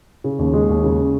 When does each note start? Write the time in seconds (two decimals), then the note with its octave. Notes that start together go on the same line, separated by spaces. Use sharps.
0.24 C#3
0.39 D#2
0.54 G#3
0.69 D#2
0.84 C#3